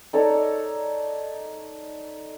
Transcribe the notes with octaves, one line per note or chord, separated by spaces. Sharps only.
D#4 A4 C#5 D5